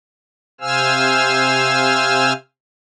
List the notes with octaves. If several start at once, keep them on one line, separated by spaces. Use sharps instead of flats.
C3 C5 F5 G#5 E6 F6